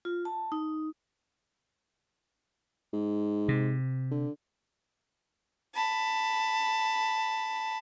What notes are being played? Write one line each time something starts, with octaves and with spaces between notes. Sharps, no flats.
F4
A5
D#4
G#2
C3
D3
A5 B5